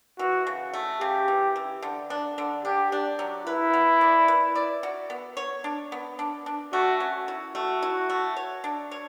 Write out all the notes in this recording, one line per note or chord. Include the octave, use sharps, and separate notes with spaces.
E3 F#4
C#3
A3
C#3 G4
E3
E3
D3
D4
D3
D4 G4
D4
F#3
E4 B4
B3
D5
B4
D5
F#4
B3
C#5
D4
B3
D4
D4
A3 F#4
C#4
E4
A3 F#4
E4
A3
C#5
D4
C#5